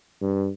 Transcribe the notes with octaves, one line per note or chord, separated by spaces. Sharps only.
G2